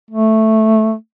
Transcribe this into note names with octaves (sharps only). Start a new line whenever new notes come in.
A3